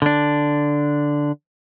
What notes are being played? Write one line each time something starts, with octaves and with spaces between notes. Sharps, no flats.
D3 D4